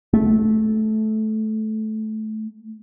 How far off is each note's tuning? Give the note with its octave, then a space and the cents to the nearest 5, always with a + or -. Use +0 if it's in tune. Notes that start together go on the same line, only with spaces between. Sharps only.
A3 -15